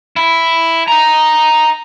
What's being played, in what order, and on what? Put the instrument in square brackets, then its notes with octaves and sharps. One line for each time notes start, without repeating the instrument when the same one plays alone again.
[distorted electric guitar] E4
D#5 A#5